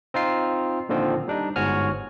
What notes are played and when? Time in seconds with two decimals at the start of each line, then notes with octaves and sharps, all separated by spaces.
0.14 C4 D#4 F4 C7
0.89 A#2 D3 D#3 F3 C4
1.28 G3 D4 D#4
1.56 G1 G#2 F#4 C#5 G#5 F6